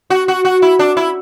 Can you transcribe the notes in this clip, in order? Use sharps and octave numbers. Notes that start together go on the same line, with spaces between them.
F#4
F#4
F#4
E4
D4
E4